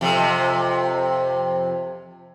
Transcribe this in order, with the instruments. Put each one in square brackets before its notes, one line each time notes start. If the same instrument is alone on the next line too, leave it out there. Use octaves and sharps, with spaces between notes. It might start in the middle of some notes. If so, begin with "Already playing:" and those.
[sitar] F2 C3